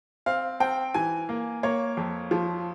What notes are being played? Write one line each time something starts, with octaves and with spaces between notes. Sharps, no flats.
C4 F5
C4 G5
E3 G#5
A#3
A#3 C#5
F2
F3